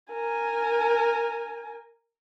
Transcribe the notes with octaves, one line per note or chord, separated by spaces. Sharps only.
A#4 G#5